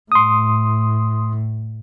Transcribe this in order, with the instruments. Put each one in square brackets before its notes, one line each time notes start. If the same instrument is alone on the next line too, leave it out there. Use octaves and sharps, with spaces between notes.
[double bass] A2 [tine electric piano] C6 D#6